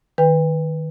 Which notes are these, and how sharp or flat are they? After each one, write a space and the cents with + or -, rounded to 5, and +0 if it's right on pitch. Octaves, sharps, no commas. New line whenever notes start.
D#3 +0 B4 +0 G5 +45